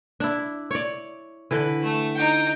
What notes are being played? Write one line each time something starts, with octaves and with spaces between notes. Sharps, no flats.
D4 E4
C#5 D5
D3 E3 B4
A3
D#4 G5